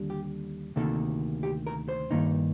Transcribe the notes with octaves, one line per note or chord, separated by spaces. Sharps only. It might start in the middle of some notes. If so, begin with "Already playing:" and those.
Already playing: D#2 D3 G3
G4
D2 C3 D#3 A#3 A4
G4
A#4
C5
G2 D#3 A#3 D#4